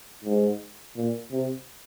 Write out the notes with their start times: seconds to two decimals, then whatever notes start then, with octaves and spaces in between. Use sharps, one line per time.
0.24 G#2
0.97 A#2
1.32 C3